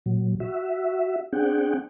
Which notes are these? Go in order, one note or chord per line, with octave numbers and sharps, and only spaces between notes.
A#2 F#3
F#4 E5
C4 D4 G#4 F#5 G5